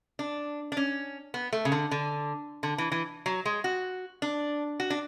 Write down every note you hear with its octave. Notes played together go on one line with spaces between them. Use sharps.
D4
D4
C#4
B3
A3
C#3
D3
D3
D3
E3
E3
F#3
G#3
F#4
D4
F#4
D4